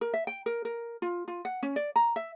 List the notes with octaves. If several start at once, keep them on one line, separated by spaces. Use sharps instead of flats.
A#4
E5
G5
A#4
A#4
F4
F4
F#5
C#4
D5
A#5
E5